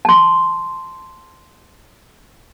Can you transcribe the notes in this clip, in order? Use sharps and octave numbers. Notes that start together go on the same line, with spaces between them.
A5 C6